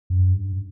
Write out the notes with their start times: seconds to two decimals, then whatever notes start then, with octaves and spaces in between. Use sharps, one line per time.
0.10 F#2
0.33 G2